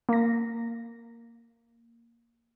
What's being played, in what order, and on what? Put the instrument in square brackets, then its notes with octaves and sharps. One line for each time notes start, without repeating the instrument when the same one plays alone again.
[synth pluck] A#3 A#6